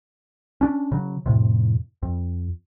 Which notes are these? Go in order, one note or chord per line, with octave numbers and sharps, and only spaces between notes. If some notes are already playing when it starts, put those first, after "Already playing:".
C#4 D4
C#3 F#3
F2 A2 C3
F2